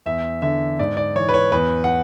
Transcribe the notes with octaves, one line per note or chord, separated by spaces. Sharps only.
E2 E5
D3 E5
G#2 D5
D5
E3 C#5
B4
C#5
E2 B4
F#5